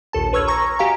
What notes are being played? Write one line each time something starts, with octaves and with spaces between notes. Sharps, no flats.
A#1 D#2 A4 A5
B4 C#5 C#6 E6 F6 G#6
A#5 C#6 G#6 A#6
F#4 G4 D#5 F5 G#5 A#5